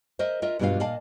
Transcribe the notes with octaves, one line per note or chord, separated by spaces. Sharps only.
A#4 C5 D#5 E5
F4 A#4 D#5 E5
G2 B2 G3 D4 F4 F5
A#2 D5 D#5 F5 A5